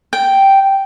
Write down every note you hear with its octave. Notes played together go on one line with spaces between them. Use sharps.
G5